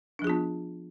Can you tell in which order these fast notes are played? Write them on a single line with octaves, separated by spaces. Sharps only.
D4 F3 G#4 F4 B3